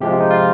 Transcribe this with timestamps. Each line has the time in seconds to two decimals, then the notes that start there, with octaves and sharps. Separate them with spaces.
0.01 C3 F3 G#3 G4
0.10 F4
0.21 D#4
0.31 F4